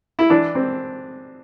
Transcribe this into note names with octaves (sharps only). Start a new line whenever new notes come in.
E4
E3 D4
C4